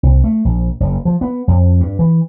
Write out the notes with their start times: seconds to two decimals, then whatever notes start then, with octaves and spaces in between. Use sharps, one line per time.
0.03 C2
0.24 A3
0.45 A#1
0.80 F#1
1.05 F3
1.21 B3
1.48 F2
1.80 G2
1.99 E3